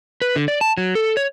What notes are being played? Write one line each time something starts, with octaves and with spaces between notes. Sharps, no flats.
B4
D3
D5
A5
F#3
A4
C#5